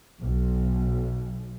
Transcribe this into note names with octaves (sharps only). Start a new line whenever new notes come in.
B1